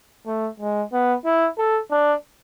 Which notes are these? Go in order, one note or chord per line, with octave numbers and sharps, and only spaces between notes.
A3
G#3
B3
E4
A4
D4